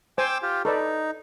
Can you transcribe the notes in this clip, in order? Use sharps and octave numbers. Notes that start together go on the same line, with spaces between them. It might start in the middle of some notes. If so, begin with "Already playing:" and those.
C5 G5 G#5 D6 E6
F4 G4
D#4 A4 B4 D5